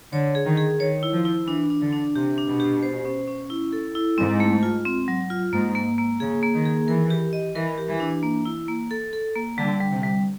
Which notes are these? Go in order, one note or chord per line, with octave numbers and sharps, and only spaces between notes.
D3 C#5
G#4
D#3
G#4
D#3 C#5
E4
F3
E4
E3 D4
D4
D3
D4
C3 G4
D4
B2
G4
C5
C#4
C#4
E4
A4
E4
G#2 C4
A3
F4
C4
F#3
F4
G#2 A#3
A#3
A#3
C#3 G#4
A#3
D#3
G#4
E3 A#4
G4
D#5
E3 A#4
G4
E3
D4
A#3
E4
A#3
A4
A4
A#3
D3 G3
G3
C3
G3